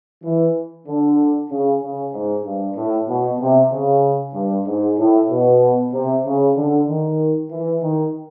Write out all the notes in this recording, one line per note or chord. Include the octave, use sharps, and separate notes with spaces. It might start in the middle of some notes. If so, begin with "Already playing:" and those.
E3
D3
C#3
C#3
G#2
G2
A2
B2
C3
C#3
G2
G#2
A2
B2
C3
C#3
D3
D#3
E3
D#3